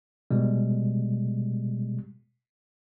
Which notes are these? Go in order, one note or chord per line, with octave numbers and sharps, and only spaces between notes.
B2 G3 G#3